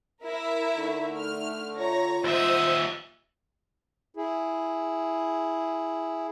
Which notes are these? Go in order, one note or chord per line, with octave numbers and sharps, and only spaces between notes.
E4 A#4 E5
D3 A3 D#4
F6
F4 C#5 A#5 A#6
D#2 C5 D#5 E5 F#5 D#6 E6
E4 G#4